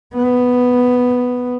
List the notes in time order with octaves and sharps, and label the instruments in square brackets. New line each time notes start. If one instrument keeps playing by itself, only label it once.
[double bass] B3